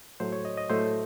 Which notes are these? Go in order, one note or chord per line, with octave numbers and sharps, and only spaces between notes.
A2 F#3 A3 C5
C#5
D#5
D#5
A2 F#3 A3 C5